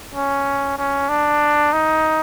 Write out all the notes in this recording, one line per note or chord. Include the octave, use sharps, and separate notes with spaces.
C#4
C#4
D4
D#4